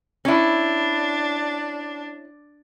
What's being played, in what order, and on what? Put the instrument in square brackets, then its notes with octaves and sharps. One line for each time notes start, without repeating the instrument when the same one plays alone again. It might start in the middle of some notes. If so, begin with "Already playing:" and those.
[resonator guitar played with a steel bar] C#4 E4 [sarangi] D4